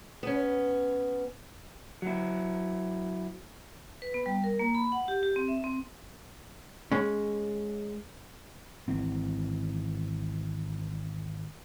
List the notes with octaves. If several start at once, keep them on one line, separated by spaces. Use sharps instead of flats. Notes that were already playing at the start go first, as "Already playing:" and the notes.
B3 C#4
F#3 E4
B4
B3
G3
A#4
A#3
B5
F#5
G4
G4
C4
E5
C4
G#3 C#4
G#1 E3 C4